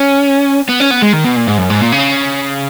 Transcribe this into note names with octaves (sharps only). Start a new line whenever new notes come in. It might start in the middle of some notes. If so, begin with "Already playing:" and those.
Already playing: C#4
B3
C#4
B3
G#3
D#3
B2
A#2
G#2
F#2
G#2
A#2
C#3